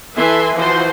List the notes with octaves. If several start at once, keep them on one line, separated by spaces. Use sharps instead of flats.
E3 A4 B4 E5 G#5 C6
E3 F3 F#4 C5 C6